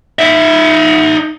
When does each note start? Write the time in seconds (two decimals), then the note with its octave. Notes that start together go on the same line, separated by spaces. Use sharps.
0.19 D#4 E5